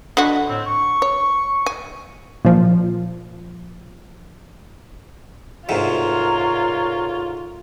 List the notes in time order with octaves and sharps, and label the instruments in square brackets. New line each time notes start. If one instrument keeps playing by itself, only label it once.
[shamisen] D3 F#4 [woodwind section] D#5 B5
[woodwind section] A2 C4
C#6
[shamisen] C#5
G#5
[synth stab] A#2 F3
[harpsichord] D2 G#2 C3 [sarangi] F4 [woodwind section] A#4 C#5